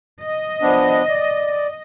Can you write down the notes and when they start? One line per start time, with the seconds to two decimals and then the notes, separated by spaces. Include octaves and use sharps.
0.23 D#5
0.62 F3 B3 D4
1.09 D5